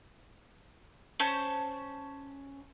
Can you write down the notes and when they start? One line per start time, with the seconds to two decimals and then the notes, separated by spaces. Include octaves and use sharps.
1.20 C#4 C5 A5 C#6